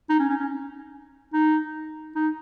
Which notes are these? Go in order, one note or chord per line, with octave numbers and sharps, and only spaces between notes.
D#4
C#4
C#4
C#4
D#4
D#4